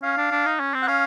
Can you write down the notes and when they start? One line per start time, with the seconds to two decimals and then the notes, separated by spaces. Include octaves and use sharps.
0.03 C#4 F5
0.17 D4
0.32 D4
0.46 D#4
0.60 C#4
0.74 C4
0.82 F#5
0.88 C#4 F5